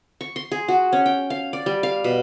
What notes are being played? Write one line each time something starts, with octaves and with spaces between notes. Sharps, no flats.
C#6
C6
G#4
F#4
C#4
G5
F5
D5
G3
F5
B2